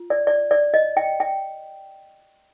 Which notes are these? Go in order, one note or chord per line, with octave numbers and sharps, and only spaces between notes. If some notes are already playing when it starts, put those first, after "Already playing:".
Already playing: F4
D5
D5
D5
D#5
G5
G5